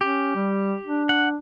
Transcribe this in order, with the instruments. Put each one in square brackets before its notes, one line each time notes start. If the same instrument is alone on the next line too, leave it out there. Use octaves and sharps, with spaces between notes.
[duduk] C#4 [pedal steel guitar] G4
[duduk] G3
D4
[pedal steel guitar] F#5